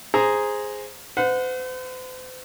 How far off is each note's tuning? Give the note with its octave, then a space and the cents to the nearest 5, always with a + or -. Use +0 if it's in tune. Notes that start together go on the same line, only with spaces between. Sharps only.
G#4 +0 C5 +0 A#5 +0
C5 -45 F#5 -25